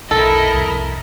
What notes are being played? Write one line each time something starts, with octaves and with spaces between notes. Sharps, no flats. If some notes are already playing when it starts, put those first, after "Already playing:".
B1 F2 E4 A4 A#4 D#5
C2 F2